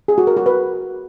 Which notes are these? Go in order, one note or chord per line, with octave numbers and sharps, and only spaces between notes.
G#4
F#4
A#4
F#4
B4